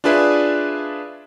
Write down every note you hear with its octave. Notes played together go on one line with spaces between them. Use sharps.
D4 F4 G#4 B4 D5 E5